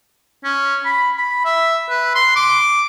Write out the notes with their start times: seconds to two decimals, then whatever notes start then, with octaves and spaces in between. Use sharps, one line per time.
0.44 C#4
0.85 B5
1.18 B5
1.45 E5
1.89 B4
2.15 C6
2.36 D6